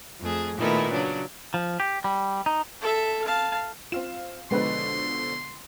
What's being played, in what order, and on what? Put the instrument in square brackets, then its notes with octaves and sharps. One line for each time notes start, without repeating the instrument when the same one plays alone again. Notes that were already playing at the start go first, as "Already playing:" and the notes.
[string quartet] F2 A3 G#4
A#2 D#3 A3 B3 E4
C#3 F#3 D4
[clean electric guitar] F3
G4
G3
D#4
[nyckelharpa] A4 E5
F5 A5
[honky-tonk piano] C4 F5 E7 [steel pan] F4
[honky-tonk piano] B2 D3 F3 [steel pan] G#3 B4 [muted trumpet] C6